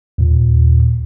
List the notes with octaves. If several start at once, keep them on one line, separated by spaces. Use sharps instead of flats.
D#2 A#2